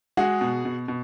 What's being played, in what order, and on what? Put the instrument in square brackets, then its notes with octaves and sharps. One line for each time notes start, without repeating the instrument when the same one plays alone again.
[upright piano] G#3 F#4 G#4
B2
B2
B2